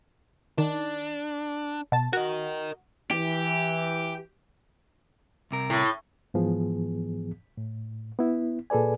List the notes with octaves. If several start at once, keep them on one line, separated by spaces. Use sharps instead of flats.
D#3 D4
B2 A5
F#4 A#4 D#5
E3 G4
C2 C3 A#4
A2
G#2 E3 F3 B3 G#4
A2
B3 E4
A#2 G#4 A4 B4 D5 G#5